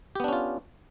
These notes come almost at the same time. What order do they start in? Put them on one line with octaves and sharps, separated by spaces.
G4 B3 D4 C#4 F4